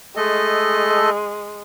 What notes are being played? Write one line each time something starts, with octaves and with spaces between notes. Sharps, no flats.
G#3 A3 A4 D#5